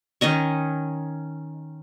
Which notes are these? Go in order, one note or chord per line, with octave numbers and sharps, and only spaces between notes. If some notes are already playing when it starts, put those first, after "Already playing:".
D#3 C#4 D#5 C#6